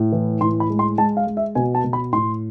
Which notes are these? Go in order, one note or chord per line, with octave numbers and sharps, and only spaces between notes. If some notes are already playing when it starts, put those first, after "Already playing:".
Already playing: A2
E3
A2 C6
B5
G#3
C6
G#3 A5
F5
G#3
E5
B2 G#5
A5
B2
B5
A2 C6